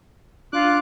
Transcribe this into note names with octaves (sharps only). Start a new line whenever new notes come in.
D4 F4 D6 F#6